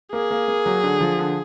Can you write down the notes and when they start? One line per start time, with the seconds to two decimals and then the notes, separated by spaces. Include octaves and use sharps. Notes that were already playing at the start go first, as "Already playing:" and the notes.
0.12 A#3 G#4
0.31 A#3
0.48 A#3
0.66 F#3
0.84 D3
1.01 F3
1.19 D3